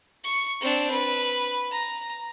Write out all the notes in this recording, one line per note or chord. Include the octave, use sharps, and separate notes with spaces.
C#6
C4 D4
B4
A#5